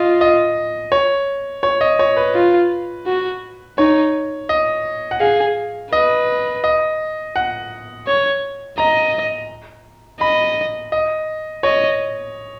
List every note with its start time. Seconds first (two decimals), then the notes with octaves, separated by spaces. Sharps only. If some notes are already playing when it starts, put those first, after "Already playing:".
Already playing: F4 D#5
0.21 D#5
0.92 C#5
1.63 C#5
1.81 D#5
1.99 C#5
2.17 B4
2.35 F4
3.07 F#4
3.78 D#4 C#5
4.49 D#5
5.11 F#5
5.20 G#4 F5
5.93 B4 D#5
6.64 D#5
7.36 F#5
8.07 C#5
8.78 D#5 A#5
10.21 D#5 B5
10.92 D#5
11.63 C#5 D#5